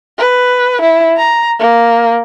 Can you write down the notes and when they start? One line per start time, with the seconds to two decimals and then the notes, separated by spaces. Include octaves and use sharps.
0.19 B4
0.82 E4
1.17 A#5
1.60 A#3